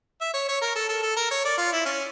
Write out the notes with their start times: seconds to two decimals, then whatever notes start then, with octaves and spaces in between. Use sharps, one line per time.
0.21 E5
0.34 C#5
0.48 C#5
0.62 A#4
0.76 A4
0.89 A4
1.03 A4
1.16 A#4
1.31 C#5
1.45 D5
1.58 F4
1.73 E4
1.85 C#4